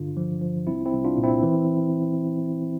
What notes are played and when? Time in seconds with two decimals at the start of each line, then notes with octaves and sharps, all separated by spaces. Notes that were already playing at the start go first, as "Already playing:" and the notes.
Already playing: G2 D3 D4 F4
0.17 F3
0.41 F3
0.67 C2 C4 E4
0.86 C4 E4
0.93 C2
1.05 D4 F4
1.18 A#2
1.23 C4 E4
1.43 E3